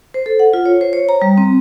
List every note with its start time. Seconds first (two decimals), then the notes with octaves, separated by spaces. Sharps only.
0.14 C5
0.26 A4
0.39 F#5
0.53 F4
0.66 C#5
0.81 C5
0.93 C#5
1.09 A#5
1.22 G3
1.38 C4